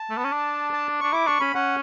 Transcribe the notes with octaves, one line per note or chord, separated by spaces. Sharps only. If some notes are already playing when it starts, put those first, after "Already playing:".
Already playing: A5
A3
B3
C#4
D4
A5
D4 C#6
E4 D6
D4 C#6
C#4 B5
C#4 F#5